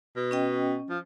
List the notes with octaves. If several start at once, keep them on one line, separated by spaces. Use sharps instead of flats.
B2
C#4 D#5 G5
F3